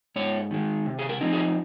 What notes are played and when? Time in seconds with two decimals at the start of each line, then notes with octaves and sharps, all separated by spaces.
0.16 G#2 C#5
0.51 D#3 G#3
0.86 C3
0.99 G#4
1.09 A#4
1.21 F3 C4 D#4
1.33 G#4